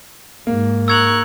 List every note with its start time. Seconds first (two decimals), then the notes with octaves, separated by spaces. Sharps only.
0.47 G#2 A#3
0.88 A#4 C#6 E6 F#6 G#6 F7